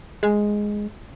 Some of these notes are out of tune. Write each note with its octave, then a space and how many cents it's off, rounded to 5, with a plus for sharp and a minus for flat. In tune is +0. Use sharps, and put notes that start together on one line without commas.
G#3 +0